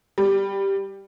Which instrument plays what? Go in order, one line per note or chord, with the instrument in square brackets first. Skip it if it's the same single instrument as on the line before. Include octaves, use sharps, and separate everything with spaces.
[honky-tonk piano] G3